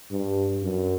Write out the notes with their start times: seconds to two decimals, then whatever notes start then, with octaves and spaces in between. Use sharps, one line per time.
0.11 G2
0.63 F#2